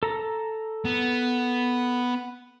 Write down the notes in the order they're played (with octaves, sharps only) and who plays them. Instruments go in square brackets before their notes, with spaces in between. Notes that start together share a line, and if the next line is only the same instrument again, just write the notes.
[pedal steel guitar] A4 A#5
[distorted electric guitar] B3